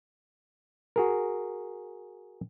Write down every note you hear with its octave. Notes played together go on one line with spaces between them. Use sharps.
F#4 G#4 A#4